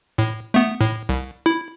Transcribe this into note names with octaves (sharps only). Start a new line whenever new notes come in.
A2
A3 B3
A2
C2
E4